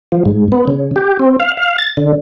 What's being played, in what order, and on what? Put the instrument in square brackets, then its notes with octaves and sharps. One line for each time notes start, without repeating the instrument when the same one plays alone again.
[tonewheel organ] F3
G#2
B3
C#3
G4
C4
F5
F5
A6
D3